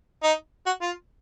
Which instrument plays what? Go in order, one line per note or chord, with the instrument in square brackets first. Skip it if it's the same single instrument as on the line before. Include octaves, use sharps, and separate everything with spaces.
[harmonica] D#4
F#4
F4